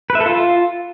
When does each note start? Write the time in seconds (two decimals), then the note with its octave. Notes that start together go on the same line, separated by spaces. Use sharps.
0.10 B4
0.15 E5
0.21 A4
0.26 F4